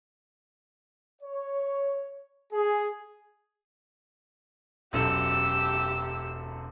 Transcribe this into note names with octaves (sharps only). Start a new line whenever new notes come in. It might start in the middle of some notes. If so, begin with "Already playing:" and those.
C#5
G#4
E1 F#2 G4 A4 E6